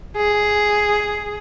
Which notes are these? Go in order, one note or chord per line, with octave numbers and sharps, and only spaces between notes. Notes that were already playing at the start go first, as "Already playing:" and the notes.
G#4